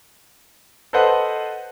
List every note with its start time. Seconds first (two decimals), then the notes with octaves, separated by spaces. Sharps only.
0.93 A4 B4 C5 D#5 F#5